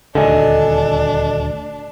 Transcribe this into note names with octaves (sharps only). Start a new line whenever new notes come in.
D#1 D2 D3 D4 A4 D#5 G#5